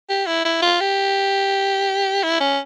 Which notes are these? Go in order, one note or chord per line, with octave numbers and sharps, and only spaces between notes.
G4
E4
E4
F4
G4
E4
C#4